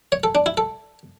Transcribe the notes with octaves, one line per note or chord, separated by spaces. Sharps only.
C#5
A4
D4
E4
A4